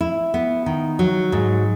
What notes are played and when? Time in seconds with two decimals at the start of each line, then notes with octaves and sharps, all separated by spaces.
0.01 E4
0.34 B3
0.66 D#3
0.99 F#3
1.32 G#2